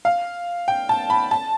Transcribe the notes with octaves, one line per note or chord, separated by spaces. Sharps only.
F5
G5
A5
B5
A5